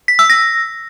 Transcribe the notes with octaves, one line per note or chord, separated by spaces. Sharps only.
B6
E6
A#6